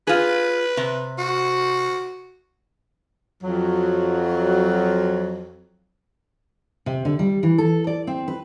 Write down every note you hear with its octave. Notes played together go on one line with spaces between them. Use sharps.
F4 G#4 B4
C3
F#4
F2 F#3
C3
D3
G3
E3
A4
D5
C4
B4